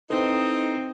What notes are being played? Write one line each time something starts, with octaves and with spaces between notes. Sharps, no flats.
C4 D#4 E4 A4 B4